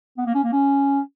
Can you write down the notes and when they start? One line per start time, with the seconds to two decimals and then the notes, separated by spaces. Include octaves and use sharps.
0.18 B3
0.26 A#3
0.35 C#4
0.44 A#3
0.52 C#4